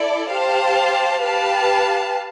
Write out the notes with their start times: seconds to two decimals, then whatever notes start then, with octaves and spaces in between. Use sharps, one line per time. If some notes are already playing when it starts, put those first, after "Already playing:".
Already playing: E4 A4 D5
0.31 G4 C5 F5 A5
1.22 G4 B4 F5 A5